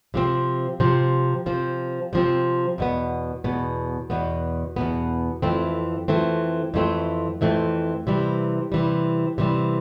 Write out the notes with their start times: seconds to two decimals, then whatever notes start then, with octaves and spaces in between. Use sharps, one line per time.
0.14 C3 F3 C4
0.80 C3 F3 C4
1.46 C3 F3 C4
2.13 C3 F3 C4
2.78 E2 B2 B3
3.44 E2 B2 B3
4.10 E2 B2 B3
4.76 E2 B2 B3
5.42 F2 E3 A3 C4
6.08 F2 E3 A3 C4
6.74 F2 E3 A3 C4
7.41 F2 E3 A3 C4
8.07 C3 E3 G3
8.72 C3 E3 G3
9.38 C3 E3 G3